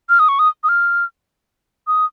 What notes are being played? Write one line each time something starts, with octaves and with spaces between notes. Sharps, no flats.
F6
D#6
C#6
D#6
D#6
F6
D#6